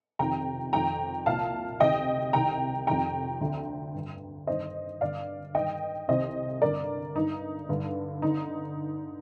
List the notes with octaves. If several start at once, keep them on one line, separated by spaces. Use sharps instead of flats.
F2 C3 D#3 G5 A#5
F2 D#3 G5 A#5
C2 A#2 F5 A5
D2 C3 D#3 D#5 G5
C2 C3 D#3 G5 A#5
F2 C3 D#3 G5 A#5
D2 D3
G2 D3
G2 D#3 C5 D#5
G2 D3 D5 F5
G2 D#3 D#5 G5
C2 C3 D#3 C5 D#5
G2 D3 A#4 D5
G2 D3 D#4
G2 D3
D3 D#4